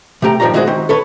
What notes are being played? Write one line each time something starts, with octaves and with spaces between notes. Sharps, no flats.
C3 A3 G4 G#5 A#5
B1 G2 D#3 F3 D5 A#5
D#3 G#3 E4 F#4 G#4 C5
D#3 C4
A4 B4 C#5